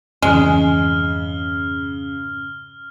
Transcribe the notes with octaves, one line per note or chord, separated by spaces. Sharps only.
F2 G#2 C#3 E3 G#3 F6 G7